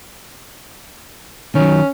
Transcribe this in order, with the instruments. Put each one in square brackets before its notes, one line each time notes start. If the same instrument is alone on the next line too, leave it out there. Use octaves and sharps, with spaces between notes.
[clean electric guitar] D#3 F#3 [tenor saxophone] C#4